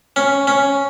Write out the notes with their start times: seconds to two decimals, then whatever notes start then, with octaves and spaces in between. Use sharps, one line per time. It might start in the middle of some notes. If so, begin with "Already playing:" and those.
0.16 C#4
0.47 C#4